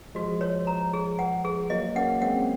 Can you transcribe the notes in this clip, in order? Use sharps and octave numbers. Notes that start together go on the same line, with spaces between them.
F3 G#3 F#4
C#5
A#5
G#4
F#5
G#4
F#3 A#3 D#5
A#3 C#4 F#5
G#3 C4 F#5